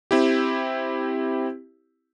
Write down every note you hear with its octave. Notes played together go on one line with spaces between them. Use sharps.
C4 E4 G4